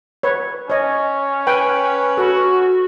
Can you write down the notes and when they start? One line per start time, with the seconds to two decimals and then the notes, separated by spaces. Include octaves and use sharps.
0.23 B4 C#5
0.70 C#4 C#5 D#5
1.47 B4 G5 G#5
2.17 F#4 A4